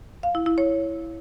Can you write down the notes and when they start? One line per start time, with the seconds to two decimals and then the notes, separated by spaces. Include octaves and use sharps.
0.23 F5
0.35 E4
0.46 E4
0.58 C#5